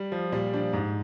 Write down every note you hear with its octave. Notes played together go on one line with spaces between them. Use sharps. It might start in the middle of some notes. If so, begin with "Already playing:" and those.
Already playing: G3
F3
A#2 G3
F3 D4
G#2